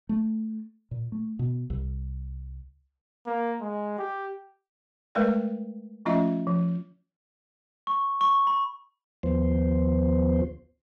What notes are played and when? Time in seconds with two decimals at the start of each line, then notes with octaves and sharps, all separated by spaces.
0.09 A3
0.91 A#2
1.12 A3
1.39 B2
1.70 C2
3.26 A#3
3.61 G#3
3.98 G4
5.15 G#3 A3 A#4 B4 D5 G5
6.05 F3 A3 C#4 F4 D#5 E5
6.47 F3
7.87 C#6
8.21 C#6
8.47 B5
9.23 D#2 F3 B3 C5